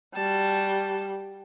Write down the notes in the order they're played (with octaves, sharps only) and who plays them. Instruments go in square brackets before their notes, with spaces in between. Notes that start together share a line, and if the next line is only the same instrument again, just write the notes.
[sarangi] G3 [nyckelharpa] F#4 A5